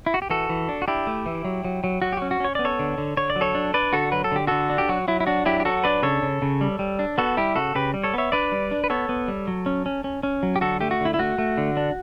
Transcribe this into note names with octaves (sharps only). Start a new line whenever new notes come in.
E4
F#4
G4
E3 F#4 A4
E3
D4
F#4
D4 E4 G4
A3
E3
F#3
F#3
F#3
F#3 F#4
G4
C#4 F#4
F#4
C#4 C#5
B3 D5
A4 C#5
D3
D3
D3 C#5
D5
F#3
A4 C#5
D4
D4 B4 D5
D3 F#4 A4
F#3 B4
A4
D3 G4
D3 F#4 A4
D4
G4
F#3 F#4
F#3 E4
E4
D4 F#4
F#3 E4 G4
G4
F#3 F#4 A4
D4 B4 D5
C#3 A4 C#5
C#3
C#3
G3
G3
D4
B3 F#4 A4
G3 E4 G4
C#3 F#4 A4
C#3 G4 B4
G3
A4 C#5
B3 C#5 E5
D4 B4 D5
G3
D4
B4
B3 A4 C#5
B3
G3
F#3
C#4
C#4
C#4
C#4
F#3
G4
D3 F#4 A4
A3 G4
F#4
D3 E4
E4
A3 F#4
A3
D3
D4